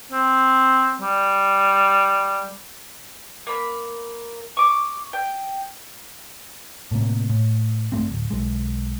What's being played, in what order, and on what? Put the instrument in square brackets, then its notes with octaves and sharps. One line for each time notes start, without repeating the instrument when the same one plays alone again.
[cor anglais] C4
G3
[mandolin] A#3 B5
C#6 D6
G5
[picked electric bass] A2 C3 A#3
A2
G2 A3 C4
D1
B1 G#3